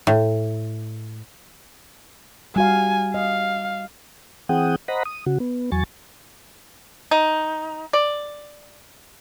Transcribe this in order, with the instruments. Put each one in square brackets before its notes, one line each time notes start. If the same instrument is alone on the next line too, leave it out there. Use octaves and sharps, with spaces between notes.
[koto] A2
[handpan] G3 F#4 F5 [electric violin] G#5
[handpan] D#5 [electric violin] F5
[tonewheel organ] E3 C4 G#4 F#5 G5 D#6
C5 D#5 F#5 A#5 B5
D#6
C#3 F#4
B3
E2 F#3 G#5 C#6 A6
[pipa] D#4
D5